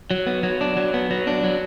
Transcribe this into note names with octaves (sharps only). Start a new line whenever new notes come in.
F#3
B3
F#3
D4
F#3
B3
F#3
D4
F#3